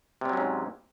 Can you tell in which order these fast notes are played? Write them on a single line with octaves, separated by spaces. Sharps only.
C3 G3 F#3 C#4 G#2